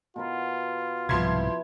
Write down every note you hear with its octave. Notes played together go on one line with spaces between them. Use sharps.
B2 F4 A#4 B5
C2 G#2 B2 F3 E4 B4 C6 G#6